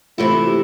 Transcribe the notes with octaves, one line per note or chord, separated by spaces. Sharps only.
C3 E3 A3 E4 F4
G4